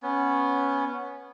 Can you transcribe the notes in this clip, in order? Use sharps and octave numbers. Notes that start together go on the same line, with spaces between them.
B3 C#4